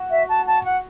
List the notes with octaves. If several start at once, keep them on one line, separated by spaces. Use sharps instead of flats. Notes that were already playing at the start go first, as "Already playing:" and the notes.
Already playing: F#4
E5
A5
A5
F#5